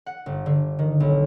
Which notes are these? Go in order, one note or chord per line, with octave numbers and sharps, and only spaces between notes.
F#5
G1
D3
D#3
B1